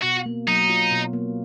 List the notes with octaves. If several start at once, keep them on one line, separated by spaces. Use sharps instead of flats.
B2 F#4
A#3
F#3 D#4
F4
B2
A#3